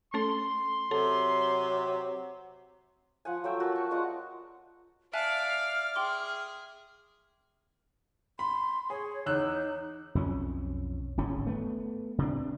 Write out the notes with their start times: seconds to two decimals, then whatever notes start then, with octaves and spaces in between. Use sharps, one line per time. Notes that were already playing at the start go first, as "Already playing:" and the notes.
0.14 A3 C#4 A4 C6
0.91 C3 F#3 A4
3.25 F3 F#5 G#5
3.44 F#3 A3 E5 G5
3.60 F#4 A#4 A5
3.76 C#6
3.91 G#3 F4 D5 F#5
5.13 D5 E5 F5 G#5 A5 F6 F#6
5.95 G#4 G5 C6 D6
8.39 B5 C6
8.90 G#4 C#5
9.26 E2 D#4 C#5 E6 F#6
10.15 B1 F2 C#4
11.17 D1 G#1 G#2 C#4
11.47 A3 B3
12.18 C3 D4